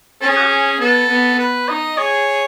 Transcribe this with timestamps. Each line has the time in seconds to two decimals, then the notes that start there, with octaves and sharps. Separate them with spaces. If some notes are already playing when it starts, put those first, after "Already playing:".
0.21 C#4 A4
0.29 G#4
0.37 F#4
0.44 G#4
0.80 B3 A4
1.09 B3
1.39 B4
1.68 D#4 D#5
1.97 G#4 C#5